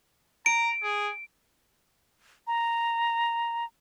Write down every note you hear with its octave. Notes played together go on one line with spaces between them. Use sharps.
A#5 D7
G#4
A#5